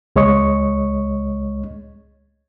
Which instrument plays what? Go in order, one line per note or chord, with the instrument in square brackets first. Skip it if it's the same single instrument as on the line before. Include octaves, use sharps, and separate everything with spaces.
[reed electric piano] C#2 G#3 C#5 D#5 C#6